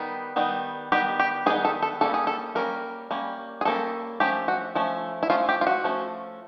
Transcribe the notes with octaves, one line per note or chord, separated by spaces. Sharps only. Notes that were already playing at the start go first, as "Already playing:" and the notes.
Already playing: D#3 G3 B3 D#4
D#3 G3 B3 D#4
D#3 G3 B3 D#4 G4
G4
D#3 G3 B3 D#4 G#4
A4
A4
G3 A#3 C#4 A4
G#4
A4
G3 A#3 C#4 A#4
G3 A#3 C#4
G#4
G3 A#3 C#4 A4
F3 A3 C#4 G4
F#4
F3 A3 C#4
E4
F3 A3 C#4 F4
G4
F4
F#4
F3 A3 C#4